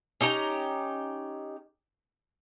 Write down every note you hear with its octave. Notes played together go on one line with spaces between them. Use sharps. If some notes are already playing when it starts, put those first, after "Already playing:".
C#4 D#4 G4 A#5